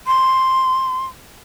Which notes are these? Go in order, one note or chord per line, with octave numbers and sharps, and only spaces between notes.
C6